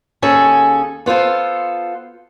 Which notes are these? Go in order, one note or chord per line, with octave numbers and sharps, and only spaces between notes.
D#2 C#4 G#4 A4
B3 F4 A4 C5